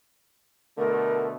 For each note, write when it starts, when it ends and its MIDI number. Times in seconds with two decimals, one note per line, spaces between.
0.78 1.37 47
0.78 1.37 50
0.78 1.37 57
0.78 1.26 70